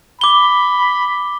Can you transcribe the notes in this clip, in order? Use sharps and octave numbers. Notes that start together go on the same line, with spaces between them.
B5 D6 G7